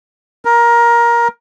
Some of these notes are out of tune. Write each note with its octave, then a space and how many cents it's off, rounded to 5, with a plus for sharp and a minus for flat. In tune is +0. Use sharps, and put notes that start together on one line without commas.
A#4 +15